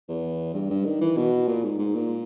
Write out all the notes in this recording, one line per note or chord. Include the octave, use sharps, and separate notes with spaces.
E2
G2
G2
D#3
E3
B2
A#2
G#2
G#2
A#2